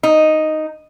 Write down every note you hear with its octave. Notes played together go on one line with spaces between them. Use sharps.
D#4